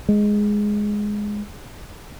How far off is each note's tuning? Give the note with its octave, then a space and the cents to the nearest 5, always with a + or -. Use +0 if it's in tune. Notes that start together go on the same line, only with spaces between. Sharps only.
G#3 +0